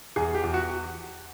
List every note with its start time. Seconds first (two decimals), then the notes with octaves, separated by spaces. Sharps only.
0.16 E2 G#4
0.35 G4
0.44 E2
0.54 F#4